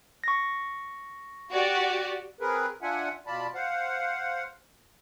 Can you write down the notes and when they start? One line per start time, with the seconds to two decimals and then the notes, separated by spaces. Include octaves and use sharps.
0.24 C#6 A#6
1.51 F#4 G4 D5
2.40 C4 G#4 A#4 B4
2.82 D4 F4 E5 F#5 G#5
3.27 B2 F4 D5 A5 B5
3.54 C5 F5 F#5